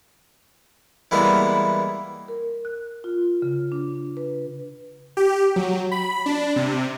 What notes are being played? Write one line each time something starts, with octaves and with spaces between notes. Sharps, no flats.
E3 G3 G#3 A#3 B3 E4
A#4
F#6
F4
C#3
D4
B4
G4
F#3
B5
D4
C3